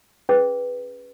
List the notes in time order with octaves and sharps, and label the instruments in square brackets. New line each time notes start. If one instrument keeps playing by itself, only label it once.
[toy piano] C#4 G#4 B4